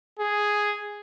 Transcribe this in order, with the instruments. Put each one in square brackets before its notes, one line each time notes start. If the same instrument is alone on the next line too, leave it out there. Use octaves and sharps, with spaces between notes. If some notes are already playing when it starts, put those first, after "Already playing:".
[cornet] G#4